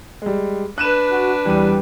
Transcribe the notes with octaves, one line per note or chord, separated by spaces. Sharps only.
G3 G#3
D4 B4 F#6 D#7 E7
F#4
E2 G3 D#7